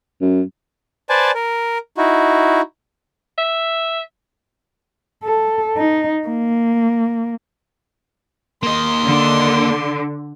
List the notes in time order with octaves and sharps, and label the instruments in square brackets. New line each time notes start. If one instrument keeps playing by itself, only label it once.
[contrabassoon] F#2
[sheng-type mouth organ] B4 C5 D5 G#5 A5
A#4
D#4 E4 F#4
[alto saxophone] E5
[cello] A4
D#4
A#3
[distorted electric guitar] A#3 D#5 [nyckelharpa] C6
[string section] D3